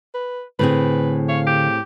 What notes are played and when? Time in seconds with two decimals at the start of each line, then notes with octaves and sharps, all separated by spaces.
0.14 B4
0.59 A2 D3 C4 G#4 B4
1.29 C#5 F5
1.47 G4